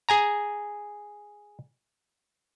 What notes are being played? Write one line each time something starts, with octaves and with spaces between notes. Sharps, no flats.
G#4 G#5 A#5